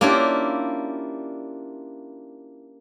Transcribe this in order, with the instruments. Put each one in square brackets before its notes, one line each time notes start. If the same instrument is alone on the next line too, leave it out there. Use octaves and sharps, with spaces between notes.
[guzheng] A#3 C#4 D4 E4 F4 G4